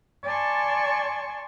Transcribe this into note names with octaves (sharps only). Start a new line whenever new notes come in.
D5 G#5 A5 C6 C#6